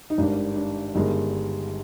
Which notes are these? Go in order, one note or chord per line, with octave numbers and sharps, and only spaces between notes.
D#4
G#1 G2 D#3 D4
D4
G1 G2 D#3 G#3